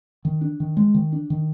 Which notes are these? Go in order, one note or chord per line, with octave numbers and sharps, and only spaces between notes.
D#3
D4
D#3
G#3
D#3
D4
D#3